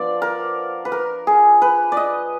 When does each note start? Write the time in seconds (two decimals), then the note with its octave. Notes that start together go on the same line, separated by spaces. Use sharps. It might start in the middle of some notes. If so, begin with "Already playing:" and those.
Already playing: F3 B3 D4 F4 D5
0.22 A#4
0.85 B4
0.92 A#4
1.27 G#4
1.62 B4
1.92 D5
1.97 D#5